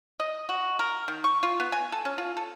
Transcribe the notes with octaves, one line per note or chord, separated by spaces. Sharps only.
D#5
F#4
A#4
D#3
C#6
F4
B3
G#5
A4
C#4
F4
A4